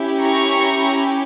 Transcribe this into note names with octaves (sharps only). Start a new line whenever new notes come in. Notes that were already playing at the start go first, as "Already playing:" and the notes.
Already playing: C#4 E4 G4
A#5 C#6